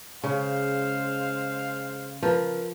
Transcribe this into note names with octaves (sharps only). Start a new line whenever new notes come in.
C#3 G#3 C5 F5
F3 A#4 B4